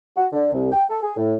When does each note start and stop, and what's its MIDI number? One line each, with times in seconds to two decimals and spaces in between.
0.17 0.27 66
0.33 0.51 50
0.53 0.70 36
0.72 0.83 79
0.89 1.02 69
1.03 1.13 68
1.17 1.35 45